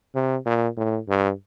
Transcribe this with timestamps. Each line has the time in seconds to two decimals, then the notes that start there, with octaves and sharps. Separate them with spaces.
0.15 C3
0.46 A#2
0.77 A2
1.09 G2